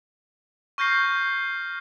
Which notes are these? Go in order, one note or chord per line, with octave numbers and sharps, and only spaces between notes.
C#6 F6 G6 A#6 C7